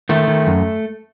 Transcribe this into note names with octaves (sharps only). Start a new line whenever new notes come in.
D#3 A3
D#3
F#2